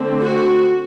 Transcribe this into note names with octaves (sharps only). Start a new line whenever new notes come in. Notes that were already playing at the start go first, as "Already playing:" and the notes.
Already playing: D3 A3 C4
F#4